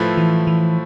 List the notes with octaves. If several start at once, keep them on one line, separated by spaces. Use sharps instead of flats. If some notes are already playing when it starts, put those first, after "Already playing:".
Already playing: A2 F3 A3 E4 B4
E3
E3